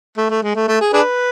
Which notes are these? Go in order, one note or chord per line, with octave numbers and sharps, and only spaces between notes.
A3
A3
G#3
A3
A3
G#4
D4 G#4 B4